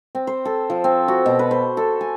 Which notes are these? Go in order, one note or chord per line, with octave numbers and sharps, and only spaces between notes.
C4
C5
A4
F3
C4
F#4
B2
B4
C5
A4
G#5